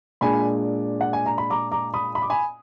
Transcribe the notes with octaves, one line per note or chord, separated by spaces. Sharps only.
A#2 G#3 D4 G#5 B5
F#5
G#5
A#5
B5
A#5 D6
A#5 D6
B5 D#6
B5
D6
G#5 B5